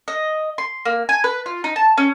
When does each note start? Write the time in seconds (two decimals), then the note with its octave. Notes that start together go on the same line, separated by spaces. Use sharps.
0.08 D#5
0.58 C6
0.85 A#3
1.09 G#5
1.24 B4
1.46 F4
1.64 D#4
1.76 A5
1.97 C#4